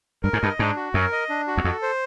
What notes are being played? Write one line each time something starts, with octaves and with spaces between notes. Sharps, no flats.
G2 A#4
G#2
G2 D#5
G#2 D4
F#4
F#2 A#4
D#5
D4
F#4
E2
F2 A4
C5